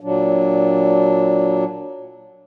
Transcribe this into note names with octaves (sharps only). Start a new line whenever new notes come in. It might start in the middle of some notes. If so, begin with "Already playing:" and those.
A#2 F#3 D4